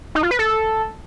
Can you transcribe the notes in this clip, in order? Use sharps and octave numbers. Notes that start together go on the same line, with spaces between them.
D#4
F4
B4
A4